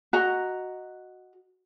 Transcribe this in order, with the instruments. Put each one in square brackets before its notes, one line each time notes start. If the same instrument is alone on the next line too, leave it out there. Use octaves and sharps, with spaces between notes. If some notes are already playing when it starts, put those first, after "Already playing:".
[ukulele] F#4 D#5 A#5